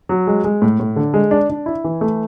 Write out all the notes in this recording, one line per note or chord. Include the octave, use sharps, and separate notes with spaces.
F#3
G#3
G#3
A2
A2
D3
G#3
D4
D4
E4
E3
A3